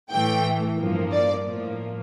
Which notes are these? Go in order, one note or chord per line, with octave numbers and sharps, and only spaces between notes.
A2 E3 A3 G5
G2 F3 A#3
D5
A2 F3 A#3